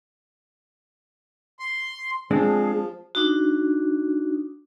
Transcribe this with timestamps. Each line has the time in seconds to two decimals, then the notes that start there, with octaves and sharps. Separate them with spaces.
1.59 C6
2.31 F3 G#3 C4 D4 G#4
3.15 D4 D#4 F#4